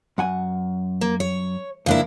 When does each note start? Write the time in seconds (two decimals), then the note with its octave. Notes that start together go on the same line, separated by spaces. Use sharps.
0.18 F#2 F#5 G#5
1.01 A#3
1.20 C#5
1.86 C#2 F3 A#3 D4 E4